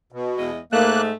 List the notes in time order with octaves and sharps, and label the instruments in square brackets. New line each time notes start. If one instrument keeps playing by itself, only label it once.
[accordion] B2
[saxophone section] E2 G#3 D#5
[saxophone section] G#2 A3 [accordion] A#3 F#6